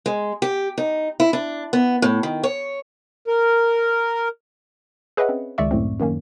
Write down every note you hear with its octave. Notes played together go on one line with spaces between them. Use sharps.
G#3
G4
D#4
E4
D4
B3
A2
D#3
C#5
A#4
G#4 B4 C#5 D#5 E5 F#5
C4 C#4
C#2 D#3 G#3 D5 E5 C#6
F#2 A2 A3 C4
F#2 D#3 A#3 C#4